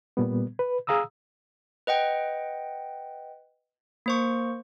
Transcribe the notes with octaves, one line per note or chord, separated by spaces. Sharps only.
A#2 G3 B3
B4
G#4 F5 A#5 D#6 E6
B4 D#5 F#5 G5
A#3 C5 C#6